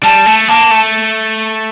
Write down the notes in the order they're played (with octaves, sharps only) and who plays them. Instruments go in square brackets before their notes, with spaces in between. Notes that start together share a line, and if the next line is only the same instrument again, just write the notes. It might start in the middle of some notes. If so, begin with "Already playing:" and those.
[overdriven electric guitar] G3 [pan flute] A5
[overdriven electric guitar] A3
[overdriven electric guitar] A#3 [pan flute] A5
[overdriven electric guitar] A3